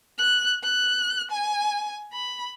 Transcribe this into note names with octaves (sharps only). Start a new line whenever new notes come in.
F#6
F#6
G#5
B5